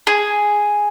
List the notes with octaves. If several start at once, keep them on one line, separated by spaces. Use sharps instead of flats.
G#4